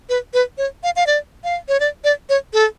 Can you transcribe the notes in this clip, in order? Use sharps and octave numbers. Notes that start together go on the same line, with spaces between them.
B4
B4
C#5
F5
F5
D5
F5
C#5
D5
D5
C#5
A4